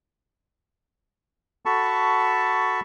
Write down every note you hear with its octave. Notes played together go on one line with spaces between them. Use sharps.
F#4 A4 A5 B5 C#6